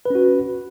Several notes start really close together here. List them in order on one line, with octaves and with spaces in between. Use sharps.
B4 C#4 F#4